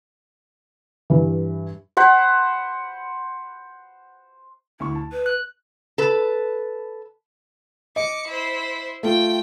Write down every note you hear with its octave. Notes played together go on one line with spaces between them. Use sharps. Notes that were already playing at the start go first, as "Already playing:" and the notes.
G2 E3
C5 F#5 B5
D2 E4 C#6
A5
B4
F#6
A4 B4
D#5 D6 C#7
E4 C5
A3 F4 G5